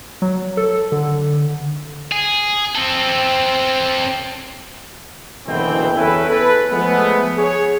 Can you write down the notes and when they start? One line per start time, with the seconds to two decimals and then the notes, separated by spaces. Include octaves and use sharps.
0.22 F#3
0.57 A4
0.92 D3
2.12 G#4
2.75 C4 A4
5.46 F#1 B2 D3 E3 C4 G5
5.96 E2 C#4 E4 A4 B4
6.29 A4 B4
6.71 F3 G#3 A3 B3
7.38 G#4 C#5